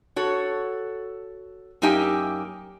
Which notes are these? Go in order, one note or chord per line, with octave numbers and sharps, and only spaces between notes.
F#4 A4 C#5
F#2 A#3 D#4 G4 E5 G#5